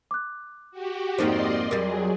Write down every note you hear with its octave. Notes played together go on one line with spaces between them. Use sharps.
D6 F#6
F#4 G4
F2 G#2 A#3 D#4 C5 D5 D#5 C6
F2 F#3 G3 G#4 A#4